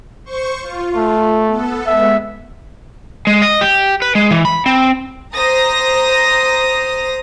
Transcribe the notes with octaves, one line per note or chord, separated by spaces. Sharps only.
C5 C#6
F4
A3
B3 A4
G#3 B3 E5
G#3
D#5
G4
B4
G#3
E3
B5
C4
C5 A#5 D#6 A#6